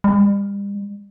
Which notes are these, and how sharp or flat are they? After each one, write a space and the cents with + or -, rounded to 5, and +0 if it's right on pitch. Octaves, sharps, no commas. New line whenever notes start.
G3 +40